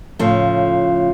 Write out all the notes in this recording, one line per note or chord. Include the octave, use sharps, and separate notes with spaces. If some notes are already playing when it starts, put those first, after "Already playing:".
A2 C#3 F3 A3